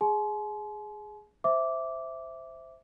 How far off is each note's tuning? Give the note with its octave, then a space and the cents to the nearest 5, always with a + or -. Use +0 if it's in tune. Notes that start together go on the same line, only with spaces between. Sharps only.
G#4 +0 G#5 +45 C6 +0
C5 +0 E5 +0 D6 -10